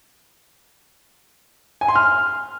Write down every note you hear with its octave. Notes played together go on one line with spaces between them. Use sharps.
G#5
C6
F6